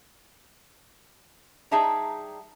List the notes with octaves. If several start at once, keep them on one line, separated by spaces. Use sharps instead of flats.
G3 D#4 G#4 E5 A5 A#5